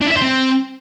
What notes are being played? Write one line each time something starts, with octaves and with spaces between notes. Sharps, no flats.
D4
E4
E5
C5
C4